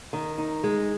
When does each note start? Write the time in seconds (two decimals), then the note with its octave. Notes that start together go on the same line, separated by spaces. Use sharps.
0.13 D#3
0.38 D#4
0.64 G#3